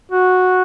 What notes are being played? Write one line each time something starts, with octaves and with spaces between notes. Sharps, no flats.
F#4